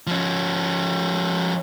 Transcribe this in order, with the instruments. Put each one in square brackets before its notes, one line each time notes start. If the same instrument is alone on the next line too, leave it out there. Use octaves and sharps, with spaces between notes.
[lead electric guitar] F3 C#4